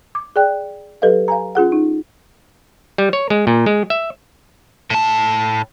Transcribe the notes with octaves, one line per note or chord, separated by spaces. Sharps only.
D6
G#4 D5 G5 F#6
F#3 G4 A4 B4 D#5 F5
F5 G#5 A#5
C#4 F4 G#4 F#5
D#4
G3
C#5
G#3
A#2
G#3
E5
A2 A5